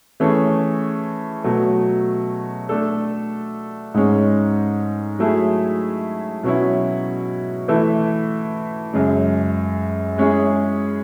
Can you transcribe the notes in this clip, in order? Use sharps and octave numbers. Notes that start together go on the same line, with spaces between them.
E3 A3 C#4 G#4
B2 F#3 A3
A3 D4 A4
G#2 G#3 C#4
F#3 A3 E4 G#4
B2 F#3 C#4 E4
E3 A3 E4
F#2 C#3 G#3
G#3 C#4 E4 G#4